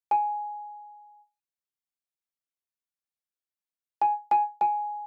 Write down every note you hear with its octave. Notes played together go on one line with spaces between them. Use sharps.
G#5
G#5
G#5
G#5